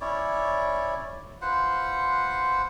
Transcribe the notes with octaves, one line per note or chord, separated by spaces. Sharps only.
C#4 E4 C#5 D5
F4 B4 C5 F#5